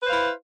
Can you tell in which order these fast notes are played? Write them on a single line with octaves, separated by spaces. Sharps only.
B4 C5 F5 E4